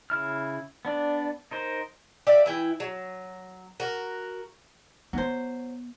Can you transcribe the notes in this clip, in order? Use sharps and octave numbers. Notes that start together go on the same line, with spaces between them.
C#3 E4 F6
B3 D4 D5
D#4 A#4 C5
G4 D5 E5 F5
E3 E4 G5
F#3
F#4 A#4
F#3 B3 C5